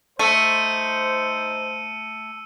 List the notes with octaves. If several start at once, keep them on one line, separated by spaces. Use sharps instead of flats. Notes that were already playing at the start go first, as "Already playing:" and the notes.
A3 D#4 C5 E6 C#7 D#7